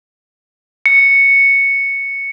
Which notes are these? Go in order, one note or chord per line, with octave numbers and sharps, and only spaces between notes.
C#7